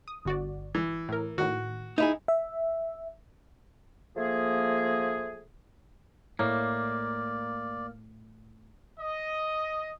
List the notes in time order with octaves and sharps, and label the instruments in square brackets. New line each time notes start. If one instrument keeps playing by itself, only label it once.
[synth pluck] D#6
G1 F#4 D5
[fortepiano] E3
[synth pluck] A2 A#4
[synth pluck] A2 D#3 [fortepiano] F#4
[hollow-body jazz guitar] D#4 E4 G#4
[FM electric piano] E5
[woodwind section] F3 A3 A#3 G#4
[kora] A2 [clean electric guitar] A#3 [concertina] D5
[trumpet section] D#5